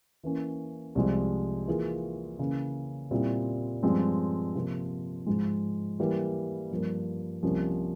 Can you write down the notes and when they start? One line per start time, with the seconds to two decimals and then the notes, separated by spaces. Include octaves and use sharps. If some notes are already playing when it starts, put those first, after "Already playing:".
0.24 E3 A#3 C#4
0.95 C2 C3 F3 G#3
1.68 E3 A#3 F4 G#4
2.39 C#3 E3 A#3
3.11 A#2 G3 C4 E4
3.83 G2 F3 G#3 C4
4.55 C3 F3 A#3
5.26 G#2 F3 G#3
5.99 E3 G3 A#3
6.71 G2 F3 A#3
7.43 C2 C3 F3 A#3 C#4